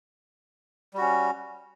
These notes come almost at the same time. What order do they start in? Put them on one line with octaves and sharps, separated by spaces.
G3 F#4 C#4